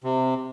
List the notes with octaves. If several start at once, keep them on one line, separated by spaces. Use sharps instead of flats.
C3